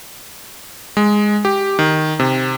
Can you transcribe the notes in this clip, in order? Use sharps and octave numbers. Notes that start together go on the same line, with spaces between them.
G#3
G4
D#3
C3